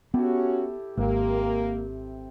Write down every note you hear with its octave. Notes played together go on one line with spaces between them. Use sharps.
B3 C#4 E4 F#4 G4 A4
G#1 C3 A#3 C4